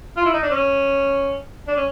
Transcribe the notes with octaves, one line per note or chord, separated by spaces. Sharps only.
F4
E4
D#4
D4
C#4
D4
C#4